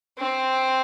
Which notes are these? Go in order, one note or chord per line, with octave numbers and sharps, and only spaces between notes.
C4